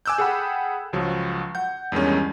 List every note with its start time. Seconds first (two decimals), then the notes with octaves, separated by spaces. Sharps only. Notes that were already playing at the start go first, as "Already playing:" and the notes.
0.06 G#5 D6 E6 F#6 G6
0.18 G#4 A4 F#5 G5 B5
0.93 C#2 F3 F#3
1.55 F#5 G6
1.92 E2 G2 D#3 G#3 C#4